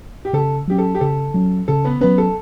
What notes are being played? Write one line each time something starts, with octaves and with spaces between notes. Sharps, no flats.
G4
C#3 A4
F#3 C#4 G4
A4
G4
C#3 A4
F#3 C#4
C#3 A4
B3 B4
F#3 B3 C#4 B4
A4